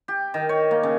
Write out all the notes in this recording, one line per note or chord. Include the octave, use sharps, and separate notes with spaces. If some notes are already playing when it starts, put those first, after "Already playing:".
G4
D#3
C#5
A#3
C#3